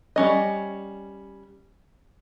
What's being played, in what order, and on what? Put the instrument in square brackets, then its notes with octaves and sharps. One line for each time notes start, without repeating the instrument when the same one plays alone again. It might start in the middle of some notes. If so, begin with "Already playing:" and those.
[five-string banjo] G3 C#4 D#5